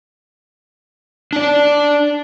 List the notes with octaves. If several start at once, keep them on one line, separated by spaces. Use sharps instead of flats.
D4 D5